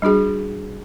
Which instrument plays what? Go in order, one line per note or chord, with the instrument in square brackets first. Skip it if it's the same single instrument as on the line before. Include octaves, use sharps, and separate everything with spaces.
[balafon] G3 D4 F#4 G#4